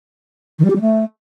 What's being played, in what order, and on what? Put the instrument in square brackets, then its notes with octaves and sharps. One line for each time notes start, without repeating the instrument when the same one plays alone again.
[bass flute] D#3
G3
G4
G3
A3